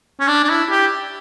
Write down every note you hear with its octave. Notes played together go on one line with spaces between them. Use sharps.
C#4
D4
D4
E4
G4